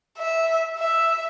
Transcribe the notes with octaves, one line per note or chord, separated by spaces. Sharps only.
E5
E5